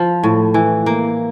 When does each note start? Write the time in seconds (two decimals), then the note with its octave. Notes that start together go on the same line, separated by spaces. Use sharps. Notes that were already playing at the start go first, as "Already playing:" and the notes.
Already playing: F3
0.23 A2
0.54 E3
0.86 A#3